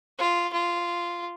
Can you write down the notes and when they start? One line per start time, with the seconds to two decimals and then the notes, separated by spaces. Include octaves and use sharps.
0.19 F4
0.53 F4